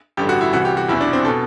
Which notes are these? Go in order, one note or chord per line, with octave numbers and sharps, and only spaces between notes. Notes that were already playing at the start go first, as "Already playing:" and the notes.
A1 G2 D3 G4
F#4
E4
C2 C3 E3 F#4
G4
F#4
F#1 E2 B2 E4
D4
C4
B2 A4